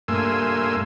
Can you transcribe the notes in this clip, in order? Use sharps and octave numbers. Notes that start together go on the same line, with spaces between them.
G2 A3 A#3 G#5 C6 E6